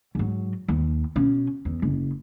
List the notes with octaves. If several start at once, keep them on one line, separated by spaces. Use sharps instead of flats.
G#2 F#3
D#2
B2 C#4
E2
F#1